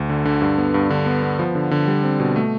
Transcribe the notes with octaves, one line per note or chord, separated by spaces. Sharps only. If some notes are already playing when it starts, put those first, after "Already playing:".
Already playing: D2
D3
D3
G2
B3
G2
D3
B3
B3
F3
D3
D3
G3
C4
B2
A3